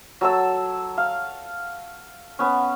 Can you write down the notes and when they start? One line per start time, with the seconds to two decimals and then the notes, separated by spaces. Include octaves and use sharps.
0.21 F#3 A4 E6
0.98 F5
2.39 B3 C#4